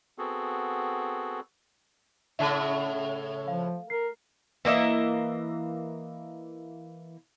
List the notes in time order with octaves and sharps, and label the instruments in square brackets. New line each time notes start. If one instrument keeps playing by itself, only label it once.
[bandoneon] B3 C4 F#4 G#4 A4
[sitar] A2 C#3 [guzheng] A3 F#5 [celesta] E5 A5
[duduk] F3 [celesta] F5
[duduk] A#4 [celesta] C7
[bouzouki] E3 A#3 D#5 E5